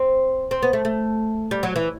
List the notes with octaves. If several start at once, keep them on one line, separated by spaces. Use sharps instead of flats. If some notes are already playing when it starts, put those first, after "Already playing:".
Already playing: C4
C4
B3
A3
A3
G3
F#3
E3